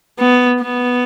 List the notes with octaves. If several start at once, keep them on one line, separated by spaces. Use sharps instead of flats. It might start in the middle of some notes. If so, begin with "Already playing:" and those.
B3
B3